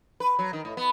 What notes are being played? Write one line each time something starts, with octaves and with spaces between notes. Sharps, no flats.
B4
F#3
D#3
A2
B3